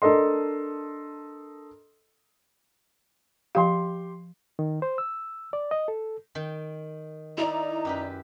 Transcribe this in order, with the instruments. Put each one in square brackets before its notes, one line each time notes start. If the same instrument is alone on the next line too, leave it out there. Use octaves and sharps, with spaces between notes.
[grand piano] D4 A4 A#4 D#5 C6
[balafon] F3 F5 [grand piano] G4 C6
[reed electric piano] D#3
C5
E6
D5
D#5
A4
[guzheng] D#3 G5
[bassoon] D#4 [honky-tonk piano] E4 D5 [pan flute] A#5
[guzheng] F#2 G4 B4